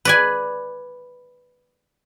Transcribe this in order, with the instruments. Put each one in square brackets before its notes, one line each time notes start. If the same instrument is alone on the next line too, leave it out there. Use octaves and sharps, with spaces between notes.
[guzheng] B4 D5 G#5